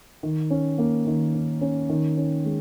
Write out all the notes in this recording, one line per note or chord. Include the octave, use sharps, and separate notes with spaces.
D#3
C#4
A#3
D#3
D#3
C#4
D#3
C#4
G#3